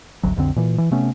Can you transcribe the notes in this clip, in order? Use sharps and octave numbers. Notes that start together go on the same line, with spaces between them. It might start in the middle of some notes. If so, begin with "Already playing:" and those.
G#1 D2 F#3
B1 F2 D3 C4
A#2 E3
E3
C3 A3 B3 C#4